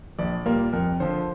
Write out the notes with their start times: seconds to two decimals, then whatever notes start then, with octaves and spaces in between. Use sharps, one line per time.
0.19 A#1 D5
0.46 A#2 G3 A#3 F4 A#4
0.73 F2 A#4
1.00 D3 F3 C5